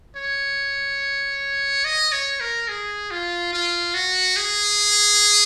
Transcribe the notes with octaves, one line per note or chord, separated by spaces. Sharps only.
C#5
D#5
C#5
A#4
G#4
F4
F4
F#4
G#4